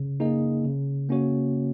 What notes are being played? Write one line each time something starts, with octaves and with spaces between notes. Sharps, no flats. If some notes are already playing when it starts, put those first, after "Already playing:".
Already playing: C#3
A#3 D#4 G#4 D#5
C#3
A#3 C#4 F#4 C#5